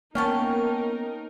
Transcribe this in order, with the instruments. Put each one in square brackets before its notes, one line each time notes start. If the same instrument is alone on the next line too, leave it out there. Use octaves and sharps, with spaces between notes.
[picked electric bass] A#3 B3 [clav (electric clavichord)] C#4 [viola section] D#4 A#4 [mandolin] F5 G5 A5